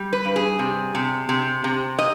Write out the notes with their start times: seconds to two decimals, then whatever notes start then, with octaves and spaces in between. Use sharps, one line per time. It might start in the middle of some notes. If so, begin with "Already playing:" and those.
Already playing: G3
0.13 B4
0.25 G2
0.36 G#4
0.59 C3
0.95 C3
1.29 C3
1.64 C3
1.99 D#5